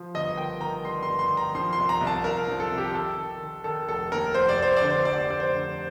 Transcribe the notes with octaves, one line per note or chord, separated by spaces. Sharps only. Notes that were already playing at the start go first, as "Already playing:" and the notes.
Already playing: F3
G1 D#5
D#3 G5
D#3 A#5
G2 C6
C6
G2
C6
D#3
A#5
F3 C6
C6
C2
A#5
C2
A5
C2 A#4
F3
A4
C3
G4
D#3 A4
D#3
D#3
D#3 A4
F1 A4
D#2 A#4
F1 C5
D5
F1 C5
D3 D5
C5
F1 D5
F1 D5
C5
D3